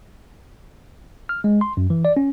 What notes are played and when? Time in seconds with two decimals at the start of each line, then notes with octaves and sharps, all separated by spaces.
1.29 F6
1.44 G#3
1.61 C6
1.77 F#2
1.90 E3
2.05 D5
2.17 C#4